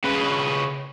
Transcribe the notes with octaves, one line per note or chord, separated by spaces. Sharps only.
C#3 B4